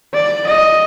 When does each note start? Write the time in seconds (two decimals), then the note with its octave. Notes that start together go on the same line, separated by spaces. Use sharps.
0.14 D5
0.47 D#5